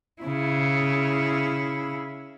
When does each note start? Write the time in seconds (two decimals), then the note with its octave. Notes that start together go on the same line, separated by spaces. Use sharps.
0.22 C#3 E4